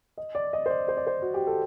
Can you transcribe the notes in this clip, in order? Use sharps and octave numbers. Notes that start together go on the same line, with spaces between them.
D#5
D5
D#5
C5
D5
C5
D5
C5
F#4
G4
A4